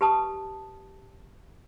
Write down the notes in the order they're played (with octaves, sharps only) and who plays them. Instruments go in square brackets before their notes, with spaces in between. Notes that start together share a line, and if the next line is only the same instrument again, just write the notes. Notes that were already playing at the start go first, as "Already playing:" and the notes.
[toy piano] G4 B4 A5 D#6